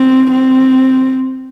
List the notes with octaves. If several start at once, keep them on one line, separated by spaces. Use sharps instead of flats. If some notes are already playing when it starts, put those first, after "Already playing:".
Already playing: C4
C4